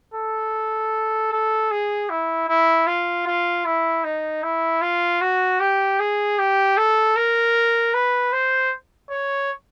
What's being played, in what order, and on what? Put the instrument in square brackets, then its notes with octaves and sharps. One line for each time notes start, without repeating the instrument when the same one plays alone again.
[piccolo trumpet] A4
A4
G#4
E4
E4
F4
F4
E4
D#4
E4
F4
F#4
G4
G#4
G4
A4
A#4
B4
C5
C#5